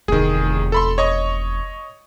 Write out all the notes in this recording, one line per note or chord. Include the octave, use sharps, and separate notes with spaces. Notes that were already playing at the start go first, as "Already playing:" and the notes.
F1 E2 D#3 G#4
A4 B5 C6
C#5 D#5 C#6